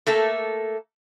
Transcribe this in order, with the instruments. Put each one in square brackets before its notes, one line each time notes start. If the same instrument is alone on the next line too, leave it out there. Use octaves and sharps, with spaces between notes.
[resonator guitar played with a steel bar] A3 A#3 A4